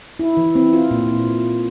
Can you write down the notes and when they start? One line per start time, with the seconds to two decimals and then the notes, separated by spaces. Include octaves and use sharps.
0.19 E4
0.37 E3
0.55 C4
0.73 F4
0.91 A#2